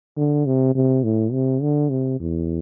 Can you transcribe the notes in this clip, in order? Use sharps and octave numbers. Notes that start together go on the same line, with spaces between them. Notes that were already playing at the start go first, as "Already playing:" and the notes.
D3
C3
C3
A2
C3
D3
C3
E2